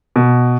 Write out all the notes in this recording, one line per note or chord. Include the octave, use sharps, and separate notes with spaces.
B2